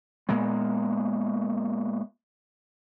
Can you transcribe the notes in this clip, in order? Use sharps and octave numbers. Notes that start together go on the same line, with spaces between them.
A#2 G#3 A#3 B3